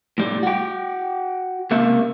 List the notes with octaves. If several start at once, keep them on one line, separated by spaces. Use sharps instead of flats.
A2 G3
F#4 G5
C#2 C3 A#3 E5